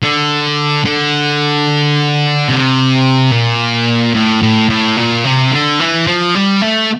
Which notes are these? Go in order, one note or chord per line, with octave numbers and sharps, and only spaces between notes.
D3
D3
C3
A#2
A2
A2
A2
A#2
C3
D3
E3
F3
G3
A3